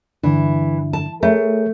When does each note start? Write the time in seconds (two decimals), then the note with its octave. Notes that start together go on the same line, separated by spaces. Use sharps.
0.23 G2 D3 E3 D4
0.93 A5
1.23 A3 G#4 A#4 C#5